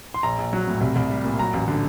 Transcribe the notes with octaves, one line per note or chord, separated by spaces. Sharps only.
C6
A#1 A#5
A#1
F#3
A2
C2
C2
G3
A#2
F#3 A#5
A1
D3